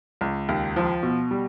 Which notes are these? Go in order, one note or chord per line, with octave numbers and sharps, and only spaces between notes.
C#2
D#2
F3
B2
G3